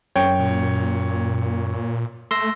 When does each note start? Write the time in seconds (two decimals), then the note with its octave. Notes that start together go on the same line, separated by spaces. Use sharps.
0.16 F#2 C#5 G5
0.39 A#2
2.31 A3 C6 E6 A#6